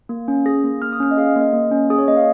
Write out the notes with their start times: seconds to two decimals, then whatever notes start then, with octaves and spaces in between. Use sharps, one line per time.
0.09 A#3
0.28 C#4
0.46 G#4 A#6
0.64 A#3
0.82 A#3 F6
0.93 D#6
1.00 C#4 F6
1.11 D#5
1.17 G#4 F5
1.29 D#5
1.36 A#3
1.41 D#5
1.53 A#3
1.71 C#4
1.90 G#4 D#6
1.98 C#5
2.08 A#3 D#5
2.17 F5